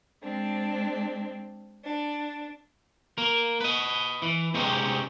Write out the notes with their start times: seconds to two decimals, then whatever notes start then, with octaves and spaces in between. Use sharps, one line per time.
0.22 G#3 C4 D4
1.84 D4
3.18 A#3 A#4
3.60 B4 D#5
4.22 E3
4.54 C3 G#3 C4 C#4 D#4 G4